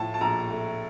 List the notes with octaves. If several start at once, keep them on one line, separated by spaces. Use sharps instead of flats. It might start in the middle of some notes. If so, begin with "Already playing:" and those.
Already playing: A2 F3 A3 A5
A5
A#1 A#5
A3